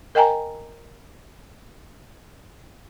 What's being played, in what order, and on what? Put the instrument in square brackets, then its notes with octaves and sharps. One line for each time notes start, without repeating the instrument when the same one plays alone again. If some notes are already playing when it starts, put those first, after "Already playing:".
[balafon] A#4 D#5 G5 G#5 A#5